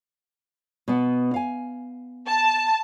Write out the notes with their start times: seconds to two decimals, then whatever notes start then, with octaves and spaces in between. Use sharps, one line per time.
0.88 B2 B3
1.34 F5 G#5
2.27 A5